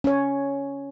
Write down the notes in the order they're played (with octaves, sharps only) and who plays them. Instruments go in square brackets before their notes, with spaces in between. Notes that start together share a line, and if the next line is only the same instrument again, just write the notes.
[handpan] C#4 C#5